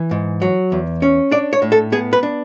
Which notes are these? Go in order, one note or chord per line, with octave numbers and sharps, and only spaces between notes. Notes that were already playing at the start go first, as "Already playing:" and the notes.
Already playing: E3
G#2
F#3
E2
C#4
D4 D5
C#5
A2
A4
B3 G#4
B4
D4